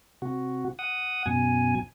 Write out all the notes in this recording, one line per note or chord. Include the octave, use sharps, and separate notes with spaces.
C3 F#4
F#5 D#6
F#2 B2 G#5